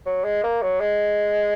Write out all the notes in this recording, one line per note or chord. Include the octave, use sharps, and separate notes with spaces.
F#3
G#3
A#3
F#3
G#3